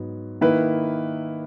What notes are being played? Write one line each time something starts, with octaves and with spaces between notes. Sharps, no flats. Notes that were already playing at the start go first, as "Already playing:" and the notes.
Already playing: G#2 F#3 B3
D#3 A#3 E4 B4